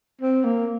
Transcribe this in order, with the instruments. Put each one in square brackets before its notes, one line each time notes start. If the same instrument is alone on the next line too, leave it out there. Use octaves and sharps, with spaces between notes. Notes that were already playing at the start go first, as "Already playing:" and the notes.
[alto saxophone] C4
A#3